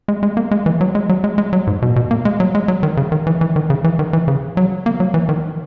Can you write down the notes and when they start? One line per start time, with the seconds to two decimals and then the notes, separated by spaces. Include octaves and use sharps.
0.08 G#3
0.23 G#3
0.37 A#3
0.51 G#3
0.66 E3
0.81 F#3
0.95 G#3
1.09 F#3
1.24 G#3
1.38 G#3
1.53 F#3
1.67 G#2
1.82 B2
1.90 A#2
1.96 B2
2.11 A#3
2.25 G#3
2.40 F#3
2.55 G#3
2.68 F#3
2.83 D#3
2.97 C#3
3.12 D#3
3.27 E3
3.41 E3
3.56 D#3
3.70 C#3
3.84 E3
3.99 D#3
4.13 E3
4.28 C#3
4.57 F#3
4.86 A#3
5.00 F#3
5.14 E3
5.29 D#3